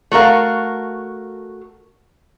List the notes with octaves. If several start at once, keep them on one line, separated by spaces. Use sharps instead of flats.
A3 F#4 A#4 F5